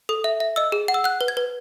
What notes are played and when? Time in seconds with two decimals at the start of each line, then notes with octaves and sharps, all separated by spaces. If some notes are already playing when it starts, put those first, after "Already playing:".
0.09 A4 D#6
0.24 E5
0.40 E5
0.56 D#5 E6
0.72 G#4
0.88 F#5
0.94 E6
1.04 F#5 F#6
1.21 B4
1.28 G#6
1.37 B4